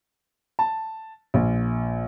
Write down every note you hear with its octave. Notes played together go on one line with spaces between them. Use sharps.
A5
A#1